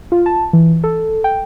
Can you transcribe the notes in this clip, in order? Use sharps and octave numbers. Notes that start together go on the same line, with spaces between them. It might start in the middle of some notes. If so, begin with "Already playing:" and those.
F4
A5
E3
A4
G5